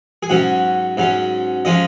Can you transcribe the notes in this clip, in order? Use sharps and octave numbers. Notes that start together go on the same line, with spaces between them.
G#4
G#2 F#3 C#4 F#4
G#2 F#3 C#4
F3 G#3 C#4 D#5